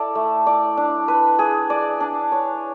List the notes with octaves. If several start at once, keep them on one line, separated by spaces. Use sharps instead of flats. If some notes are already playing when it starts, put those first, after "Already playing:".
Already playing: E4 A4 D5
A3
D5
D4
B4
G#4
D5
D4
C#5